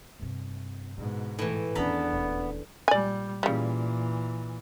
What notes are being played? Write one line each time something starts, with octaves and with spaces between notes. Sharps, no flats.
G2 C3
G#2 B2 D3
A2 E3
E2 D#3 B3 C#4 D4 A4 A#5 B5
D#1
A#2 G3 D5 G#5
A#2 C#3 E3 G3